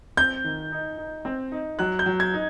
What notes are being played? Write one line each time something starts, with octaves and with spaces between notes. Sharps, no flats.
C4 G6
D#3
D#4
D#4
C4
D#4
F#3 F#6
G6
F#3
G#6
D#4